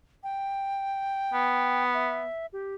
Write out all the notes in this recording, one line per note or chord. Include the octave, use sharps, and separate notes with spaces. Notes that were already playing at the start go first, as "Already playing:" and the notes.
G5
B3
E5
G4